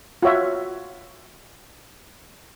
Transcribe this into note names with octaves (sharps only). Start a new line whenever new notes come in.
F4 F#4 C#5 E5